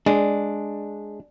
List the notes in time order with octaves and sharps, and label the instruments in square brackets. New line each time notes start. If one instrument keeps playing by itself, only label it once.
[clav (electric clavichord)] G#3 [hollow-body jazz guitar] D4